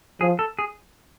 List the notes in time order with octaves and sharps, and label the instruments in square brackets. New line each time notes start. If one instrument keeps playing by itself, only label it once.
[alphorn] F3 [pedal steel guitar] G#4
[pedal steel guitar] A4
G#4